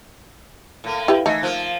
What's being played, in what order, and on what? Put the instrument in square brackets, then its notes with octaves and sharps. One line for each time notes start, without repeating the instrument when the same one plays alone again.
[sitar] A2 A#3
[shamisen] E4 G4 B4
[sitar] E3 [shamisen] A3 D#4 A#5
[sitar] F3 A#3